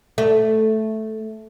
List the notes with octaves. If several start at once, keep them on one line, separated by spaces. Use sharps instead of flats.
A3